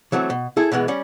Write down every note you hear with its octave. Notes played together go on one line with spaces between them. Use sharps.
E3 F#3 A3 C4
B2
E4 G#4 A4
B2 E3 G#3 B3
G3 C#4